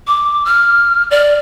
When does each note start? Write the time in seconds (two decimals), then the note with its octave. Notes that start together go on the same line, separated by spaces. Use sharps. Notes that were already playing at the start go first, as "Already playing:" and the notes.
0.07 D6
0.45 F6
1.11 D5